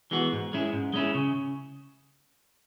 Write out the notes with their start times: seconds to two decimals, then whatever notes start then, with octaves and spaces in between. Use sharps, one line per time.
0.11 E3 G#3 B3 F#4
0.33 G#2
0.53 G#3 C#4 E4
0.73 G#2
0.93 G#3 C#4 E4
1.15 C#3